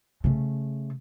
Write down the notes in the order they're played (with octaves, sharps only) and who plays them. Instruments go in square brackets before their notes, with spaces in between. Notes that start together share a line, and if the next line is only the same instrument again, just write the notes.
[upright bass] C#3 A3